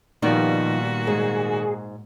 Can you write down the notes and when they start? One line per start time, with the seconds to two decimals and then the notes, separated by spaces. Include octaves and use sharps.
0.22 A#2 D#3 F3 G3 B3 D#4 F#4
1.07 G#2 G#4